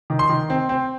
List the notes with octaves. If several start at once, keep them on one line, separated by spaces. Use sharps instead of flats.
D#3
C6
D#3
C4
C4